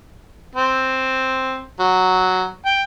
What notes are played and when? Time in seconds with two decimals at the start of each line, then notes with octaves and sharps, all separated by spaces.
0.55 C4
1.80 F#3
2.66 G5